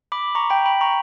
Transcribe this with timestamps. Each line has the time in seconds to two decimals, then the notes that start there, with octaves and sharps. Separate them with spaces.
0.12 B5 D6
0.35 A#5 C#6
0.50 G5 B5
0.66 G5 B5
0.81 A#5 C#6